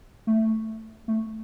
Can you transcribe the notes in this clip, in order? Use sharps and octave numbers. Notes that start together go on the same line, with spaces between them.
A3
A3